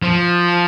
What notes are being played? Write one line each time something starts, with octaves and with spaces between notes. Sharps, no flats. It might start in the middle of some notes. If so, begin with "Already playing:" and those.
F3